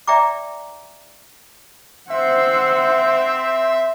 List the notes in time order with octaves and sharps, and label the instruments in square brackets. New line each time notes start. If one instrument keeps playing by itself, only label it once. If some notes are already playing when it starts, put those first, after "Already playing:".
[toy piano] D5 E5 G5 A#5 D6
[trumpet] C4 [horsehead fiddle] C5 F#5 [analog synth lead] E5